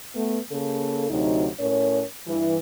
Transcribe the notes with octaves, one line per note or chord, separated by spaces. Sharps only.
A3 B3
C#3 A#3 A4
D2 C3 F#3 D#4
A2 C#4 A#4 C#5
G2 E3